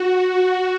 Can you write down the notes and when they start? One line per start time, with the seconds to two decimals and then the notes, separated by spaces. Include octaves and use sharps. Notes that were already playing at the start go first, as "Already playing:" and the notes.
Already playing: F#4
0.19 F#4